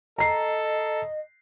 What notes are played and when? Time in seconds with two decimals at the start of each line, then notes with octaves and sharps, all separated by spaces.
0.18 A4 D#5 A#5 C7